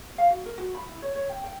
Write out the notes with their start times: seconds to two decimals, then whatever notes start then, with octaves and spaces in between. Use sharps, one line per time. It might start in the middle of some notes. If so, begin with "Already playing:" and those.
0.18 F5
0.30 F#4
0.46 A#4
0.58 F#4
0.75 B5
0.89 E4
1.02 C#5
1.15 C#5
1.29 G5
1.44 G5